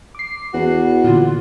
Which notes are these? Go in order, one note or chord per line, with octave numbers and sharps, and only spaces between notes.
D6 C7
E2 F#4
A#2 D3 F4